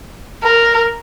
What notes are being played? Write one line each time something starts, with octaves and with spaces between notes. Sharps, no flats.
A#4